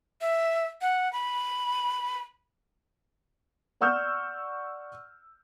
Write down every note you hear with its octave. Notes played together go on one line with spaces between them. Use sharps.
E5
F#5
B5
D5 F#5 C#6 E6 F6 G6